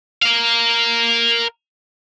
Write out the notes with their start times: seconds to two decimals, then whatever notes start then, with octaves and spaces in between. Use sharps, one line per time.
0.22 A#4 F5